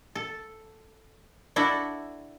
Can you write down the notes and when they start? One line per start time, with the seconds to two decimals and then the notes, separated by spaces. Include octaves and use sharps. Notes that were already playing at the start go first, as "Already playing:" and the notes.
0.15 A4
1.56 D4 E4 F#4 A4